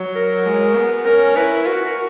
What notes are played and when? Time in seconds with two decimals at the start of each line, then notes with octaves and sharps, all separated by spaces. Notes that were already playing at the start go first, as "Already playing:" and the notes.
Already playing: F#3
0.15 A#4
0.46 G#3
0.75 B3
1.05 C#4 A#4
1.36 E4 B4
1.65 F#4 A#4
1.85 A#4